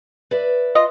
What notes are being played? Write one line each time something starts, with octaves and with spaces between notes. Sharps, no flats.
B4 D5 E5
F4 D#5